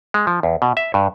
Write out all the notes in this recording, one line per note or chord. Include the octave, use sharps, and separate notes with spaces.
G#3
F3
E2
B2
E5
G2